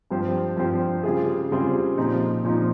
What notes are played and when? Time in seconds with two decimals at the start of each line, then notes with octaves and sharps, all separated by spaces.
0.10 G2 F3 C4 G4 C5
0.57 G2 F3 C4 G4 C5
1.03 C#3 G3 C4 F4 G#4
1.51 C#3 G3 C4 F4 G#4
1.97 A#2 F3 C4 D#4
2.45 A#2 F3 C4 D#4